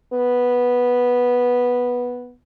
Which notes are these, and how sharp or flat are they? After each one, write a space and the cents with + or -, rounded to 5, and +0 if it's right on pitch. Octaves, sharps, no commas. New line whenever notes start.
B3 -5